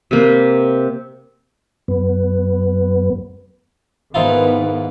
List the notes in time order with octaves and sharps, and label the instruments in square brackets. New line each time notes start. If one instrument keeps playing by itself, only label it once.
[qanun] C3 A#3 B4
[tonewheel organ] F#2 B3
[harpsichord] G#2 E4 F4 [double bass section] D#3 B3